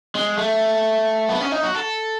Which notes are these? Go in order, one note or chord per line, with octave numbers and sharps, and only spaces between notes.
G#3
A3
B3
C#4
D#4
F#4
A4